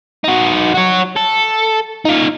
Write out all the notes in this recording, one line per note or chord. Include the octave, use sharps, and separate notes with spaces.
D#4 F#4
F#4 C#5
A4
D#4 F4